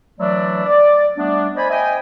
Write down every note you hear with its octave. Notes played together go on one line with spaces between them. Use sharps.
E3 F#3 A3 D4 E4 D5
D5
G3 A3 B3 D4
C5 D5 D#5 G#5 B5
C5 D#5 E5 G5 G#5